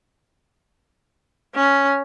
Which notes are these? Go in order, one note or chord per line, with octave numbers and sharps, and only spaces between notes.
C#4